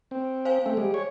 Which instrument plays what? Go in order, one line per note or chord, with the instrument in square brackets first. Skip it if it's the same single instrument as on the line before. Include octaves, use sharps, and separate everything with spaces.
[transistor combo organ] C4
[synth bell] C5 F5 G#5
[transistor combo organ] A3 C4
G3 G#3
C#5